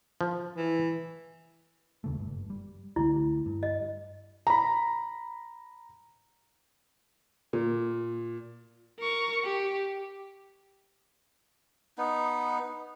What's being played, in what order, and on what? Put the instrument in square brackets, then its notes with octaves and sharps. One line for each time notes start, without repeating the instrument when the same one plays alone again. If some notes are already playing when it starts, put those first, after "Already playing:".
[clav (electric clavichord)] F3
[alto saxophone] E3
[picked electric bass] D#2 C#3 A3
F#1 G2
G3
[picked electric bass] C#2 D3 A3 [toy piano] E4
[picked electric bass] G2
[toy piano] D#5
[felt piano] A#5 B5
A#2
[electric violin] A#4 C#6
G4
[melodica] B3 D#4